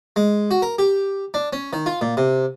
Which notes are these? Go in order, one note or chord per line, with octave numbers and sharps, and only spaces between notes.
G#3
F#4
A#4
G4
D4
C#4
D#3
F4
A#2
C3